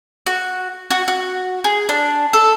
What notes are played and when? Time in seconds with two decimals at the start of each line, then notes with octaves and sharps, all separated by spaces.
0.26 F#4
0.90 F#4
1.08 F#4
1.64 G#4
1.89 D4
2.33 A4